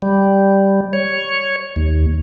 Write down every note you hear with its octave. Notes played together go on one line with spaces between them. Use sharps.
G3
C#5
D#2